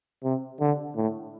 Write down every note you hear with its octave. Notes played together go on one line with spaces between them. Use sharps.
C3
D3
A2